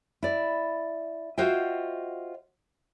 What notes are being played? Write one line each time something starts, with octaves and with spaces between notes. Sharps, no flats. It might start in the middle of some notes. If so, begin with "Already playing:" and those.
E4 D5
F4 F#4 C5 D#5 E5 G5